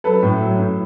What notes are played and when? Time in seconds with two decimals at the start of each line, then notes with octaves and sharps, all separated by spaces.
0.04 F#3 A4 B4
0.22 A2
0.41 F#3
0.59 A2